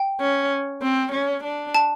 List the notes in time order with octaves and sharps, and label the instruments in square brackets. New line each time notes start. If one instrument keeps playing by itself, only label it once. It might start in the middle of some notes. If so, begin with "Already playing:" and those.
Already playing: [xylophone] G5
[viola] C#4
C4
C#4
D4
[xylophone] A5